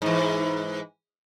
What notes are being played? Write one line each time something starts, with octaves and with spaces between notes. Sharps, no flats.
G#2 E3